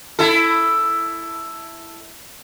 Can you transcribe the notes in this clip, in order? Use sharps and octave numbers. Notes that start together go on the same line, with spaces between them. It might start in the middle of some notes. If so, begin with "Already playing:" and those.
E4 A4